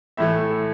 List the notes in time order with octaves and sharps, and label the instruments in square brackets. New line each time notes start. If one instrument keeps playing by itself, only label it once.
[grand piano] A2 E3 A3 E5